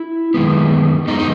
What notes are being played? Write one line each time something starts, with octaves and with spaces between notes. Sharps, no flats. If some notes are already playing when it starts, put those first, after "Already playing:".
Already playing: E4
F#2 D#3 G#3 B3
F#2 D#3 G#3 B3 D#4
D#4